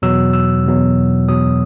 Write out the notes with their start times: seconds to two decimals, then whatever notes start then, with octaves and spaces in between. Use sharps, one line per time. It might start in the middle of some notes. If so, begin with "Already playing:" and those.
0.02 E2 B2 F#3 E6
0.33 E6
0.66 E2 B2 F#3
1.28 E2 B2 F#3 D#6